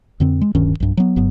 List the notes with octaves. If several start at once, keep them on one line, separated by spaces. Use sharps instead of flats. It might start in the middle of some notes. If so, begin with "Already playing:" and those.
F2 D3 C4
G#3
D1 G2 D#3 C#4
B1 G2
F#3 B3
F#1 G2 F#3 B3